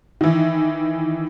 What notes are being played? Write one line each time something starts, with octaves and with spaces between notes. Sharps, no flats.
D#3 E3